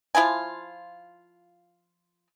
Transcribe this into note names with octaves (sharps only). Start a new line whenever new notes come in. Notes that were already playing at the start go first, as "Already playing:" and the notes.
F3 E4 F4 G#5